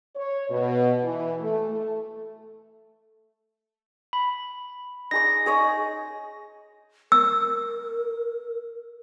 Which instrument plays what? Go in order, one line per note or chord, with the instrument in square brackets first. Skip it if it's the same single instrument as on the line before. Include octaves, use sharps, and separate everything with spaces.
[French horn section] C#5
B2
E3
A3
A3
[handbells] B5
[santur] D#4 G#4 D6 [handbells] A#6
[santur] G#4 C#5 D#5
[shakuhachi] A#4 [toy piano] E6